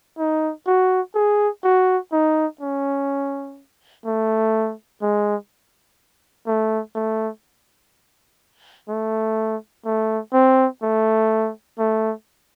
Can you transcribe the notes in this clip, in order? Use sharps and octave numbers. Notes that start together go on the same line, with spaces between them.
D#4
F#4
G#4
F#4
D#4
C#4
A3
G#3
A3
A3
A3
A3
C4
A3
A3